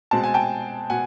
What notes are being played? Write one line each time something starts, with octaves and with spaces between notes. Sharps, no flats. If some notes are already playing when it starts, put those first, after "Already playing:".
B2 G#3 C4 A5
G#5
G5 A5
B2 F#5 G#5